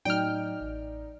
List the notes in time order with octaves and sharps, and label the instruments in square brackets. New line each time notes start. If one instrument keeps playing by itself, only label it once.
[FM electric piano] A2 F#3 [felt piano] D#4 D5 [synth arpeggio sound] G5 F6
[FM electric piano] A1